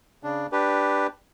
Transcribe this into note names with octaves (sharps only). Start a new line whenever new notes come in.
C#3 D4
D4 G4 B4